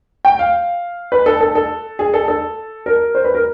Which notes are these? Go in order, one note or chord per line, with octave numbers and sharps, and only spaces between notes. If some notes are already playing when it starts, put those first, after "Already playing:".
G5
F5
B4
A4
A4
A4
G#4
A4
A4
A#4
C5
B4
A#4